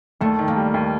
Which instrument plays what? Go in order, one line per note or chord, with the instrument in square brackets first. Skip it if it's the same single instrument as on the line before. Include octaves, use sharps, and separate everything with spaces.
[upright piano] D#2 [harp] A3
[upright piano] D#3
[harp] A#3
[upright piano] G3
D#2